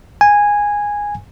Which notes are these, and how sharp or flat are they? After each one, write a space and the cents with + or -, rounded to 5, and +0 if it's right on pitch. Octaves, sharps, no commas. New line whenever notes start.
G#5 -10